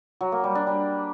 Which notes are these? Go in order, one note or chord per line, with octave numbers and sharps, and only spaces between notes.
F#3
A#3
G3
D4
G3